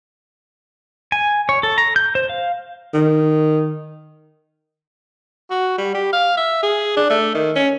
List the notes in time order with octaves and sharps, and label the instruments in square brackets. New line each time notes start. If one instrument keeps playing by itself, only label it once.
[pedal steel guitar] G#5
C#5
A4
A#5
G6
C5
F5
[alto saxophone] D#3
F#4
G3
G4
F5
E5
G#4
D4
A3
D#3
C#4